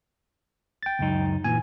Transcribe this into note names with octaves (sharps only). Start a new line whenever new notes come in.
G5 A6
C#2 F#2 D#4
A#2 D3 E3 G#5